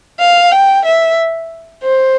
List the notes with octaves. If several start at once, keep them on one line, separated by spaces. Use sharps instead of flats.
F5
G5
E5
C5